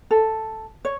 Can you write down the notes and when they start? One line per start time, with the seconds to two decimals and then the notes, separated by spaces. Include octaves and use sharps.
0.11 A4
0.85 C#5